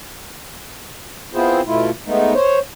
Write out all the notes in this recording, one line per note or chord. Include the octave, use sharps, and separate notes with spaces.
B3 C4 E4 F4 G#4 C5
B2 A3 E4 F4
G#3 A3 B3 D#4
C5 C#5